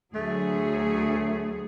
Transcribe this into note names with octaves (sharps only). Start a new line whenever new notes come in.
D2 F#3 A3 G#4